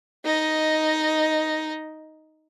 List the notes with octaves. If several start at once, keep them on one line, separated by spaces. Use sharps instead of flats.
D#4 D#5